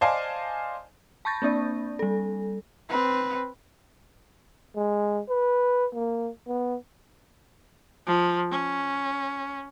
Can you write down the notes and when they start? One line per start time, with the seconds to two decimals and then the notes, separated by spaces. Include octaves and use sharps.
0.01 C5 D5 D#5 F5 G#5 A5
1.25 A5 B5 C#6 G6 A6 A#6
1.42 A#3 C4 D4 D5
1.99 G3 A4
2.89 C4 B4
4.75 G#3
5.29 B4
5.94 A#3
6.47 B3
8.07 F3
8.51 C#4